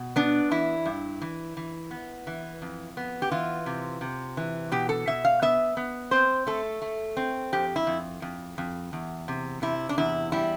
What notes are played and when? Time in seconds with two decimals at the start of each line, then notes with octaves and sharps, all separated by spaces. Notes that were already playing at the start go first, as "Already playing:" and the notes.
Already playing: B2
0.16 B3 D4
0.51 E3 E4
0.86 G2
1.22 E3
1.57 E3
1.91 B3
2.27 E3
2.62 F2
2.97 B3
3.22 G4
3.31 E3 F4
3.66 C3
4.01 C3
4.37 E3
4.72 B2 G4
4.89 A4
5.07 B2 E5
5.25 F5
5.42 B3 E5
5.77 B3
6.11 C4 C5
6.47 A3 A4
6.82 A3
7.17 C4
7.53 F2 G4
7.76 E4
7.87 F2
8.22 F2
8.58 F2
8.93 E2
9.28 C3
9.62 C3 E4
9.89 D4
9.98 E2 E4
10.32 G3 E4